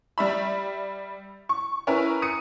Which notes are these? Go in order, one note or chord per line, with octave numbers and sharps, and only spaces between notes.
G3 E5 B5
C#6
C#4 E4 A#4 B4
D#6 C#7 D#7